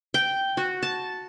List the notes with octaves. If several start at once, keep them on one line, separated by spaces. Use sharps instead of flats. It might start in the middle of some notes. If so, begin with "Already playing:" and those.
G5
F#4
A5